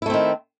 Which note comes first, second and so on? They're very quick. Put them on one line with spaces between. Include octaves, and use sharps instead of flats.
E4 A3 C4 D#3